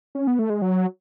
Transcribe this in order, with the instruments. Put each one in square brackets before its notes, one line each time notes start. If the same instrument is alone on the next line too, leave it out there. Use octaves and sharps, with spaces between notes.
[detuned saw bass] C#4
B3
A3
G#3
F#3